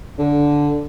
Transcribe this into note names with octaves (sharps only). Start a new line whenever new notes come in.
D3